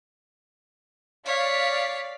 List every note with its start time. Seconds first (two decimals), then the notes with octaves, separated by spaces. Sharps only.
1.26 C#5 D5 F5 B6